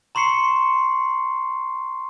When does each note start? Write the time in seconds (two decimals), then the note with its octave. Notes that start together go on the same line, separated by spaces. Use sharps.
0.15 A#5 C6 C#6 C7 C#7